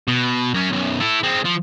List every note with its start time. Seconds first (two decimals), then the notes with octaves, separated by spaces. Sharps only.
0.08 B2
0.54 F#2 C#4
0.72 B1 F#2
1.00 E4 A4
1.23 G#3 C4
1.45 F3